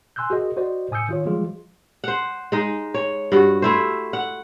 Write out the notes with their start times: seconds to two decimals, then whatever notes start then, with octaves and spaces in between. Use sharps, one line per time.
0.16 G#5 C6 E6 F#6 G6
0.30 F#4 G#4 A#4 D#5
0.56 F#4 C5 D5 D#5
0.91 A2 G#5 D#6 E6 G6 C#7
1.09 D#3 F4 C#5
1.25 E3 F3 G3 G#3 F4 G#4
2.04 C5 F#5
2.52 G#3 D#4
2.94 C#5
3.32 G2 F#4
3.62 A3 E4 C5
4.13 F#5